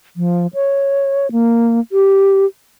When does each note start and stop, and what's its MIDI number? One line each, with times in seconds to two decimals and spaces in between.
0.16 0.47 53
0.54 1.30 73
1.32 1.80 58
1.92 2.46 67